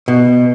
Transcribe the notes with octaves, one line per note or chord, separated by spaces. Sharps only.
B2